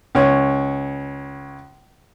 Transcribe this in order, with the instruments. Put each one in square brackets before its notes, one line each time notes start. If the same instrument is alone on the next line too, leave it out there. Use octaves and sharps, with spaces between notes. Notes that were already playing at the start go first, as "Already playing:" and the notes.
[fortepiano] C#2 C#5